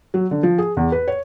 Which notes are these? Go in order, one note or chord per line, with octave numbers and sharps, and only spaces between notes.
F#3
D3
F3
G#4
E2
B4
C#5